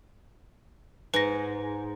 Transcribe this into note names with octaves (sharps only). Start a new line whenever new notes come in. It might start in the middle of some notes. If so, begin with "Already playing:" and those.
G#2 B4 A#6